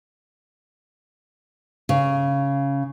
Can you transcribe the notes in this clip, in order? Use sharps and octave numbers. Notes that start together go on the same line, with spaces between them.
C#3